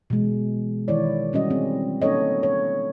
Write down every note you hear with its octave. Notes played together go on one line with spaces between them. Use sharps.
B2 E3 G#3
D#3 E3 E4 C#5 D5
G3 C#4 F#4 D#5
C4 G#4
A#3 C#4 D#4 A4 C#5 D#5
C#5